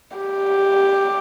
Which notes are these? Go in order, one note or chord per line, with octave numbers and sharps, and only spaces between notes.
G4